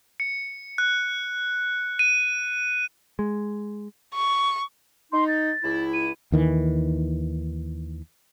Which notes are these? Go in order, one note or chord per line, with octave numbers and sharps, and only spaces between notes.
C#7
F#6
D#7
G#3
C#6
D#4 C6
A6
C#2 E4
D#7
D#2 D#3 E3